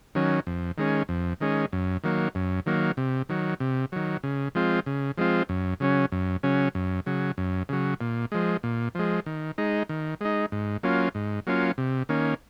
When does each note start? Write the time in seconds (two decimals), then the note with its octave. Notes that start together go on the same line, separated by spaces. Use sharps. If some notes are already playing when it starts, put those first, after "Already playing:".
0.15 D#3 F#3 C#4
0.47 F2
0.78 D#3 G#3 C#4
1.09 F2
1.41 D#3 G#3 C#4
1.72 F#2
2.04 D#3 F#3 A#3
2.35 F#2
2.66 D#3 F#3 A#3
2.97 C3
3.29 D#3 F#3
3.60 C3
3.92 D#3 F#3
4.23 C#3
4.55 F3 G#3 C4 F4
4.86 C#3
5.17 F3 G#3 C4 F4
5.49 F#2
5.80 C#3 F#3 C#4
6.12 F#2
6.43 C#3 F#3 C#4
6.75 F#2
7.06 C#3 F#3
7.38 F#2
7.69 C#3 F#3
8.01 A#2
8.32 F3 G#3
8.63 A#2
8.95 F3 G#3
9.26 D#3
9.58 G#3 D#4
9.89 D#3
10.21 G#3 D#4
10.52 G#2
10.83 F#3 A#3 C#4 F4
11.15 G#2
11.47 F#3 A#3 C#4 F4
11.78 C3
12.09 D#3 A#3 C#4